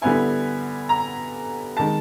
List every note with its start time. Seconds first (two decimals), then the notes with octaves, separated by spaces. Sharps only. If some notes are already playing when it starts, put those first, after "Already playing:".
0.01 D3 G3 B3 E4 G#5
0.89 A#5
1.77 D#3 G#3 A5